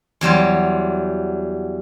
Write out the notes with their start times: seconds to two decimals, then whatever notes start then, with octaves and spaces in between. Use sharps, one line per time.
0.21 E2 F#3 G3 C5